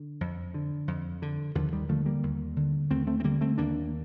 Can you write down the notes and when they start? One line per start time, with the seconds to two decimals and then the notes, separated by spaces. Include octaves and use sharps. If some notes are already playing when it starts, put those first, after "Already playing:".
Already playing: D3
0.21 F2
0.54 D3
0.88 F2
1.22 D3
1.55 D#2 D3 F3
1.72 D#3 G3
1.89 D3 F3 A3
2.06 G3 A#3
2.23 D#2
2.56 D3
2.90 D#2 A3 C4
3.07 A3 C4
3.20 C4
3.24 D3 G3 A#3
3.41 A3 C4
3.58 D#2 A#3 D4